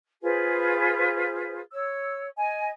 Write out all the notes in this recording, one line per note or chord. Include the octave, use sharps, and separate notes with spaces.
F4 G#4 B4 C5
C#5 E6
D#5 G#5